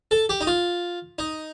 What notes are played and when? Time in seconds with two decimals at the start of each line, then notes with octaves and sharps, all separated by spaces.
0.11 A4
0.29 G4
0.41 D#4
0.47 F4
1.19 D#4